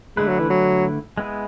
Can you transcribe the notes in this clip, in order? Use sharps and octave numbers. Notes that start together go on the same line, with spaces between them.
D3 G#3 A3 E4 B4
F#3
E3
F#3
G#3 B3 E4 G#4